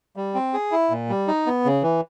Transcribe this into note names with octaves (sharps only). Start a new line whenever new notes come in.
G3
C4
G#4
E4
A#2
G3
D#4
B3
C#3
E3